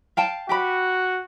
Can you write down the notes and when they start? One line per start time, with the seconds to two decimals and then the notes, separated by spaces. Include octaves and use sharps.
0.17 F5 G5 A5
0.49 F#4 G4 G5 B5